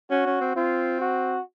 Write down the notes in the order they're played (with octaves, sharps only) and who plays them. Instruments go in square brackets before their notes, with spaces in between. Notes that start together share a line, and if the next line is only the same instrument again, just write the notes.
[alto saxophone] C#4 [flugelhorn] F#4
[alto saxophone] C#4
C4
[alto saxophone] C4 [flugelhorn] F4
[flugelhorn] F#4